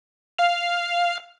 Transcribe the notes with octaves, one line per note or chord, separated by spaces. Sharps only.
F5 F6